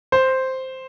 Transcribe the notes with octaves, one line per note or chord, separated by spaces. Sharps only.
C5